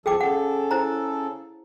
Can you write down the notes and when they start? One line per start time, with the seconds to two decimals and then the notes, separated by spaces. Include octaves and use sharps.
0.06 E2 F3 G#4 A4 G5 D6
0.21 C#3 A4 F#5
0.71 E4 C5 A#5